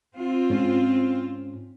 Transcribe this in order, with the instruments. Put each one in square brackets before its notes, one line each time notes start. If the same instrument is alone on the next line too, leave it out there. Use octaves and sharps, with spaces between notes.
[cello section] C4 F4
[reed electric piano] G#2 C#4